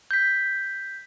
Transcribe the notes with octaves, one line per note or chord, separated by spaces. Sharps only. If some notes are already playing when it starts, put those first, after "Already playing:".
G6 B6